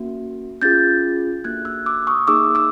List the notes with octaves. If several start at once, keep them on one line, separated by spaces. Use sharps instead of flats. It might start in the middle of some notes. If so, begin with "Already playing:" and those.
Already playing: A#3 C#4 F#4
C#4 F4 G#4 G6 A6
A#3 D4 F#4 A4 F#6 G#6
E6 F#6
D6 E6
C#6 D#6
A#3 D#4 G#4 D6 E6
D6 E6